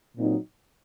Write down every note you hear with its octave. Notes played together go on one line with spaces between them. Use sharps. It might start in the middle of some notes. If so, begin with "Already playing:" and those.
A#2 F#3 C4 D#4